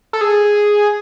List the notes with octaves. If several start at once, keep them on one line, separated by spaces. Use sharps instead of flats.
A4
G#4